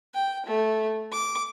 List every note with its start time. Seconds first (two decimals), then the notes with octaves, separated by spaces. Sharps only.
0.14 G5
0.46 A3
1.12 D6